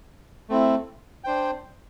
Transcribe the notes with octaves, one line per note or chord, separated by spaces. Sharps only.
A3 C4 E4
D4 C5 G5